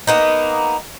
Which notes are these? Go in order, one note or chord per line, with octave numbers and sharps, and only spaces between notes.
A#3 B3 D#4